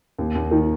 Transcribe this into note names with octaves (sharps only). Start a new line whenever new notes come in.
D#2
D#2
D#3